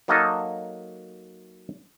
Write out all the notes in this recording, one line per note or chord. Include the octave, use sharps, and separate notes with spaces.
F#3 A#3 D#4 A4 D#5